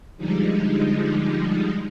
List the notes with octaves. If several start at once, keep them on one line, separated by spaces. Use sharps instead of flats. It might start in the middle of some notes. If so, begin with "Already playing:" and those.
D3 F3 G3 G#3 D#4